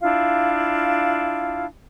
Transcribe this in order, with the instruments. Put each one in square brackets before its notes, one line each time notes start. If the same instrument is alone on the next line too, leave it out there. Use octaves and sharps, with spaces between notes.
[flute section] D4 E4 F4 F5